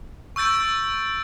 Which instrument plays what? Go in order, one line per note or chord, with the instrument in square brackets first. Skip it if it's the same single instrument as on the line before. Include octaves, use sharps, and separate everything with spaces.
[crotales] C#6 E6 G6 A6 D7